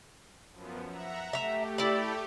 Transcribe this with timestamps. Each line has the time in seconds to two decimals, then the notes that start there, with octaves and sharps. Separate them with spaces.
0.51 F#2 F3 B3
0.84 E5 F#5 A#5
1.33 A3 G4 E5 A#5
1.78 E4 D5